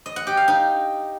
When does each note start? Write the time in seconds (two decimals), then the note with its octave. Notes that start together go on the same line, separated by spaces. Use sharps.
0.06 D#5
0.16 F#5
0.27 G4
0.37 F5
0.48 D#4